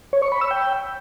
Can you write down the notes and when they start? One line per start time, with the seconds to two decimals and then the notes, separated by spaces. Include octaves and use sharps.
0.13 C#5
0.22 C#6
0.32 B5
0.41 E6
0.51 G5